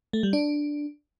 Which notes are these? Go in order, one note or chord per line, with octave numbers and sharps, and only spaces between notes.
A3
G3
D4